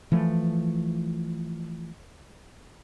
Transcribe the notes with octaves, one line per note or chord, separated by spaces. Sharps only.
E3 F3 A3